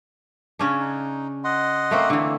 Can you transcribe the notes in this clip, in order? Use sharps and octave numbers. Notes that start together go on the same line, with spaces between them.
C#3 C#4 D4
D#4
D#5 F#5 C6
A3 A#3 C4
D3 E3